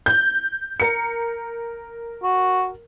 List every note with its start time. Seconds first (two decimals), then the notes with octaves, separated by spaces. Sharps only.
0.06 G6
0.80 A#4 C#7
2.23 F#4